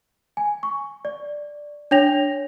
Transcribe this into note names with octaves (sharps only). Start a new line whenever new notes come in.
G#5
C#6
D5
D4 C#5 G5 A#6 F7